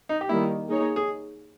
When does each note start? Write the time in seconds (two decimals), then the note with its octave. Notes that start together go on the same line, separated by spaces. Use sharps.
0.09 D#4
0.21 G4
0.29 D#3 G3 A#3 E4
0.69 A#3 D#4 G#4 C#5
0.96 G#4